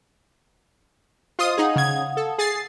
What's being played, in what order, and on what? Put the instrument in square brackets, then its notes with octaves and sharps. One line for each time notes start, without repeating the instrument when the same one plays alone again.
[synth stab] F4 C6 D#6 [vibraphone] C5 D#5
[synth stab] D#4 G#4 [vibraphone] F5 F#5 D#6
[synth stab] C#3 G#6
A4
G#4 A6 C7